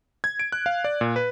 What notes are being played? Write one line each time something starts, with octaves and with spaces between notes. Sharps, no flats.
G#6
D7
F#6
F5
D5
A#2
B4